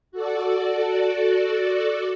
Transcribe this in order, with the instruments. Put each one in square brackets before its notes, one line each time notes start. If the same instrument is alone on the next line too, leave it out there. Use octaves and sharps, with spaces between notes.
[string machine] F#4 A4 D5